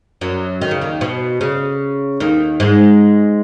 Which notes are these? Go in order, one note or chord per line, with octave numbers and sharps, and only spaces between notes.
F#2 F#3
D#3
C#3
D#2 D#3
B2
C#3
D#2 D#3
G#2 G#3